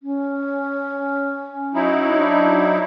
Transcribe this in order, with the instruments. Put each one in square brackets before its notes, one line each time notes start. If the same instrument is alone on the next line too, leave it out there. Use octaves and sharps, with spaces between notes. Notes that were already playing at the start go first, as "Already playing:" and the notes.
[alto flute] C#4
[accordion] F#3 D#4 E4
[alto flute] D4